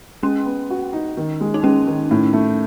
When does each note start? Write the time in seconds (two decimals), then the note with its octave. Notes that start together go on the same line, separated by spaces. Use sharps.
0.23 G#3 C#4
0.46 B3
0.70 F#4
0.93 D#4
1.17 D#3
1.41 G#3
1.54 D#4
1.63 G#3 C#4
1.87 D#3
2.11 A2
2.33 A3